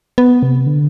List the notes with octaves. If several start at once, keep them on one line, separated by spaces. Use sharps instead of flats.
B3
C3
D3